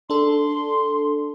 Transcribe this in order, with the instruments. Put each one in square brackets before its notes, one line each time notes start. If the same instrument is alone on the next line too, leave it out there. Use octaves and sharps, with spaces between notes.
[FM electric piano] D4 A4 [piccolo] C6